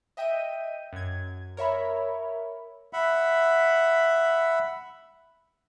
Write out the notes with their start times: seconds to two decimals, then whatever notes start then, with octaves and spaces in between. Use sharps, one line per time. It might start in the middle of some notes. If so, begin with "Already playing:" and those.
0.17 D#5 E5 G5 G6 D#7
0.93 F#2 G#6
1.57 A#4 C#5 E5 B5
2.93 E5 F#5 B5